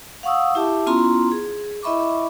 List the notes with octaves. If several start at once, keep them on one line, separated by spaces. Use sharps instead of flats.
F5 F#5 C#6 D#6 E6
E4 G4 E5 A5 D6
B3 C#4 E4 F4 A#5 C6
G#4
E4 D#5 E5 B5 C#6 D6